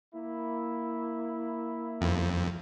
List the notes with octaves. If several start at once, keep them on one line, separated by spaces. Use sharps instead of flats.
A#3 E4
F2